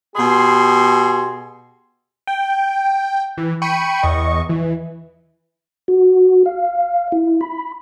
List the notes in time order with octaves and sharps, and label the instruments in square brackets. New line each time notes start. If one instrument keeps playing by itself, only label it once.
[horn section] B2 G4 G#4 C6
[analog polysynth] G5
E3
G5 B5 C#6 C#7 D#7
E2 D#5 C#6
E3
[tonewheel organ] F#4
F5
E4
B5